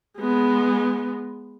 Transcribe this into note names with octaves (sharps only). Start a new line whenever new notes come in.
G#3 B3